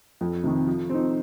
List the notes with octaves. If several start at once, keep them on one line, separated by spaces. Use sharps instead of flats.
F2
C3 D#3
F3
C4 D#4